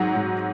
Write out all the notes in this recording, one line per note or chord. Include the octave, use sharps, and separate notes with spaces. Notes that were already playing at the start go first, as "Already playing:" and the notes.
Already playing: G#2 F#3 F#5
G#2